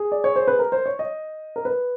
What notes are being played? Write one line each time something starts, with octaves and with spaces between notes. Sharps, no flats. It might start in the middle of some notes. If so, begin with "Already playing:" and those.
Already playing: G#4
D5
C#5
C5
B4
A#4
C5
C#5
D#5
A#4
B4